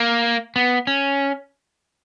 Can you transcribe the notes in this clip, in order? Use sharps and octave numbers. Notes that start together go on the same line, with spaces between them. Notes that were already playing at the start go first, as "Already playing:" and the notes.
Already playing: A#3
B3
C#4